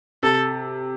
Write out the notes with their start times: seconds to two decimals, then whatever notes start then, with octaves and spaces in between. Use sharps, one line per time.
0.23 C3 A4